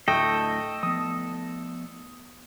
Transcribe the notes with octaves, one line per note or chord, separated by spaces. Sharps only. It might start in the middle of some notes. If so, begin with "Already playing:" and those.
D2 A2 A3 A4 D#5 G5
F3 B3 D#6